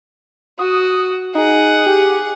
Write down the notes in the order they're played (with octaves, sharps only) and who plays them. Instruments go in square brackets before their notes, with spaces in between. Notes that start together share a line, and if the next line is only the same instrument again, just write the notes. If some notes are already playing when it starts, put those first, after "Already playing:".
[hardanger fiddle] F#4 [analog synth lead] D#6
[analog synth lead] D#4 [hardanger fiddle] G#4 F#5
[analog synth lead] G4